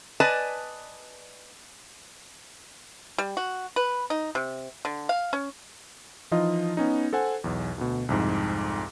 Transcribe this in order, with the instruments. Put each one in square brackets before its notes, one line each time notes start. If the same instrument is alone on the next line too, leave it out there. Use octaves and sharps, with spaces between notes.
[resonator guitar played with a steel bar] B4 D5 D#5 G#5 A5
[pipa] G3
F#4
B4
D#4
C3
D3
F5
C#4
[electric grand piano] E3 F3 D#4 F4 D#5
B3 C#4 D#4
A4 C5 F#5 G#5
B1 E2
D2 B2
C2 F2 G#2